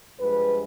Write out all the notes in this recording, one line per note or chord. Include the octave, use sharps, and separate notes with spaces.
G2 F3 G#3 B4